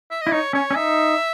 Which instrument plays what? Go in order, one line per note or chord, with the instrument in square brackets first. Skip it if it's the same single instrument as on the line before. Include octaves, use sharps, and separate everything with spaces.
[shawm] E5
D#5
[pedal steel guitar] E4
[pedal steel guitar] D#4 [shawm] C#5
[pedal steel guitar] C#4 [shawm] C#5
[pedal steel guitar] C#4
[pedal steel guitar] D#4 [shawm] E5